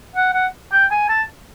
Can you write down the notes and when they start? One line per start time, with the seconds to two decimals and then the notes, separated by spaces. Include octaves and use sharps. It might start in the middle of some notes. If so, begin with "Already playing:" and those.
0.16 F#5
0.33 F#5
0.72 G5
0.91 G#5
1.09 A5